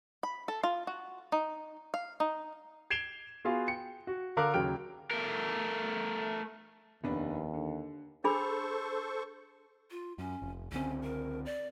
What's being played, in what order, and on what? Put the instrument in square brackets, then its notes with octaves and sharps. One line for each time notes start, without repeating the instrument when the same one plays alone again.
[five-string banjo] B5
A4
F4
F#4
D#4
F5
D#4
[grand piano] G#6 C7 D7 E7 F7 G7
B3 F4 F#4 G#4 F5
G5 C#7
F#4
D3 A4 A#4 F5 D6 F#6
D#2 C#3 F#3 G5 F6 D7
[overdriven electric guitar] A3 A#4
[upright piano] F1 B3 D4 [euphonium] D#2
[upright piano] D3
[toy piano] D4 G#4 B5 [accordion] A4 C5 C#6
[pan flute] F4
[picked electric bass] F#2 [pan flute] C#4
[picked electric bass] F1
[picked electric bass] C#2 D3 C4 [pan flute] C#4
[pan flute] A#4
D5